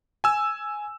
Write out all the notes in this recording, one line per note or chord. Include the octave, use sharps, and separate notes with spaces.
G#5 E6